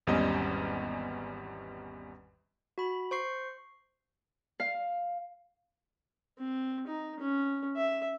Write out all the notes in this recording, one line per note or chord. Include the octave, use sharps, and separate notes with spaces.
G#1 E2 G3 C#4 D#5
F#4 B5
C5 C#6 C7
F5
C4
D#4
C#4
E5